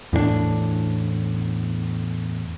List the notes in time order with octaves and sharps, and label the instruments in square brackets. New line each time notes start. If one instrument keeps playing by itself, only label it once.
[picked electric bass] E2 A2 A#3 D4